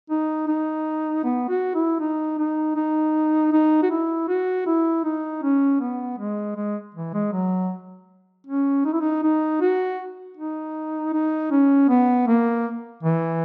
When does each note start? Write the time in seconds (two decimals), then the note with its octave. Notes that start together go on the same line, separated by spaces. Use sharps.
0.10 D#4
0.48 D#4
1.24 B3
1.49 F#4
1.75 E4
2.00 D#4
2.38 D#4
2.76 D#4
3.53 D#4
3.83 F#4
3.90 E4
4.28 F#4
4.66 E4
5.04 D#4
5.43 C#4
5.81 B3
6.18 G#3
6.57 G#3
6.95 E3
7.14 G#3
7.33 F#3
8.47 C#4
8.85 D#4
8.93 E4
9.01 D#4
9.23 D#4
9.61 F#4
10.37 D#4
11.13 D#4
11.51 C#4
11.89 B3
12.27 A#3
13.03 E3